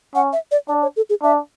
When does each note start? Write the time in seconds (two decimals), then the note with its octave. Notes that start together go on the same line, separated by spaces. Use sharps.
0.15 C#4 F#5
0.33 E5
0.51 D5
0.68 D4 D5
0.82 C#5
0.96 A4
1.10 G#4
1.22 D4 E5